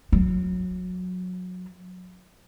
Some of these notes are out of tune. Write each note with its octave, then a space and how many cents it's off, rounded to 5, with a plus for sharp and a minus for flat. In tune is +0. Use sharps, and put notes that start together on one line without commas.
F#3 -20